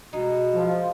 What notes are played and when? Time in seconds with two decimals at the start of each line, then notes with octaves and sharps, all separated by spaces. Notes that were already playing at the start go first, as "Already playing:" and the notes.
0.13 B2 G#3 D#4
0.54 F3